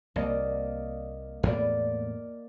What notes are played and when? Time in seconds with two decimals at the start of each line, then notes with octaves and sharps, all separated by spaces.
0.16 C2 A#3 D5 D#5
1.43 E2 A2 A#3 B3 D5